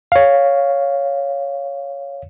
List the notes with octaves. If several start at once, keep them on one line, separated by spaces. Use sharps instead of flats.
C#5 F5